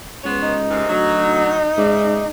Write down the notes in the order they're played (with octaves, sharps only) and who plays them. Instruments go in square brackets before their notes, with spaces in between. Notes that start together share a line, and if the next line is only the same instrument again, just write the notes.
[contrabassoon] C#2 [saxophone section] B3 C5 C#5
[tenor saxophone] D#4
[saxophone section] G#2 C3 D#3
[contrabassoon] D2 [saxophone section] F#3
[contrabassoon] G#2 [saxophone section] C#3 D5 E5